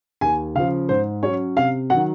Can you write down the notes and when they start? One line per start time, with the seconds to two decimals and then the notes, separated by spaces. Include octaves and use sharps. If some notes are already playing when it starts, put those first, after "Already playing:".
0.21 D#2 G#5
0.55 C#3 F3 F5
0.89 G#2 C5
1.23 F#3 C#4 C#5
1.57 C3 F5
1.90 D#3 F#3 F#5